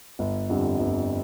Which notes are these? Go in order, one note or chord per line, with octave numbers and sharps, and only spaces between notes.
G1
F2 D3 G3
G1